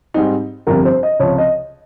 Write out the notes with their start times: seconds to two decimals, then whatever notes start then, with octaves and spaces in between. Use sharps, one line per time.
0.14 G#2 G3 C4 D#4
0.67 G1 F2 C3 G3 A#4
0.85 C5
1.03 D#5
1.20 C#2 C3 F3 C#5
1.38 D#5